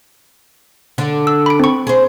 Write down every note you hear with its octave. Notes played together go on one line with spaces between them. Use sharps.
D3 D4
E6
B5 D7
C4 C#6
G#4 C5